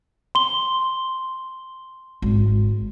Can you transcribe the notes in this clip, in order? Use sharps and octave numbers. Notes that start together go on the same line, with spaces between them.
C6 G7
G#1